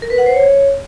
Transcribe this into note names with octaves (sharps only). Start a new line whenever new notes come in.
A#4
B4
F#5
C5
C#5